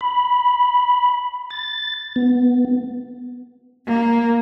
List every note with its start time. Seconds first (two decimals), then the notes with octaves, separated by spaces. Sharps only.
0.01 B5
1.50 A6
2.16 B3
3.87 A#3